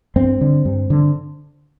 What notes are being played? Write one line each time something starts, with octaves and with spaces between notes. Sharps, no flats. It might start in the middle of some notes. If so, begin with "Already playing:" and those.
G2 C4
D3
G2
D3